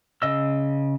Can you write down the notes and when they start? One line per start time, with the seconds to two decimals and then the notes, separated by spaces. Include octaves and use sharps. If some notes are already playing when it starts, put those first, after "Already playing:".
0.22 C#3 D#5 E6